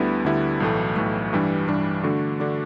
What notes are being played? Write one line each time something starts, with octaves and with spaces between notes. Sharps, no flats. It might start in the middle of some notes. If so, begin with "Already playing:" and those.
Already playing: D2 D3 G3 B3 E4
D2 D3 G3 B3 E4
B1 A2 E3 A3
B1 A2 E3 A3
G2 E3 G3 D4
G2 E3 G3 D4
D3 A3 D4 F#4
D3 A3 D4 F#4